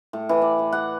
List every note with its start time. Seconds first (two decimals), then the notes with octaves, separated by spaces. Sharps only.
0.13 A2
0.29 E3
0.42 D5
0.59 D5
0.72 F#5